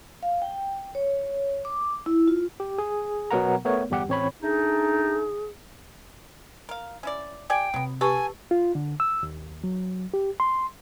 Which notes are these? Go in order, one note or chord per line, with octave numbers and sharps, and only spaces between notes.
F5
G5
C#5
D6
E4
F4
G4
G#4
B2 F#3 B3 A#4 F#5 A#5
A3 B3 A#4 C#5
G1 E2 G3 G4 F#5
A1 C4 C#5 B5
A3 D4 D#4 G#4
A#4 F5
C#4 E4 D5
G4 D5 G5 G#5
C3 F#3 B3
G4 A4 B4 G#5 C#6
F4
D3
E6
D#2
F#3
G4
C6